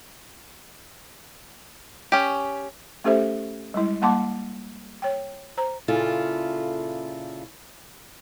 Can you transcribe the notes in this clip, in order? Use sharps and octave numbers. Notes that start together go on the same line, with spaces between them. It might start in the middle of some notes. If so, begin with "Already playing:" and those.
C#4 G4
A3 C#4 G4 A4 C5 E5
G3 G#3 E4
G3 A#3 F#5 A5 C6 D6
C#5 G5
C5 A#5
A#2 C#3 E4 F4 A4